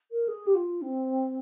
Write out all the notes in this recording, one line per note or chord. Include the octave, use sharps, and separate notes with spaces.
A#4
G#4
G4
F4
C4